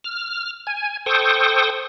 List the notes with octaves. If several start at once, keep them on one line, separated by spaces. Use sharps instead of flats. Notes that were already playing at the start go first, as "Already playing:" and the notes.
F6
G#5
A4 C5 G5 C#6 D#6